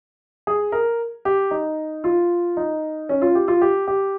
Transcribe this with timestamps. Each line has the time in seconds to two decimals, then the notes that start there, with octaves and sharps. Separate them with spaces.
0.47 G#4
0.72 A#4
1.25 G4
1.51 D#4
2.04 F4
2.57 D#4
3.09 C#4
3.22 F4
3.35 G4
3.48 F4
3.61 G4
3.87 G4